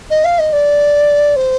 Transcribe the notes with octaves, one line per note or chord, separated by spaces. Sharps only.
D#5
F5
D#5
D5
C5